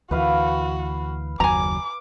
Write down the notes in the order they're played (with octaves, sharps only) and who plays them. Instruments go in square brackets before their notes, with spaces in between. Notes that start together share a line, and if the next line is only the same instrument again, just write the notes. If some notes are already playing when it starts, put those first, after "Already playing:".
[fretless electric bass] D2 E3 [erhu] F#4 [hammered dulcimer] B4 F5
[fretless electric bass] F#1 D#2 F#3 [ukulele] G#5 A#5 [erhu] D6